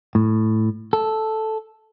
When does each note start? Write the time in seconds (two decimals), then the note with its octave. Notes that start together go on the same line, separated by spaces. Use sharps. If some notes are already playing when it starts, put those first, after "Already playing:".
0.15 A2
0.93 A4